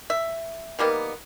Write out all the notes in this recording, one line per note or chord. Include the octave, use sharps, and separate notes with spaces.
E5
D#3 G3 A#3 B3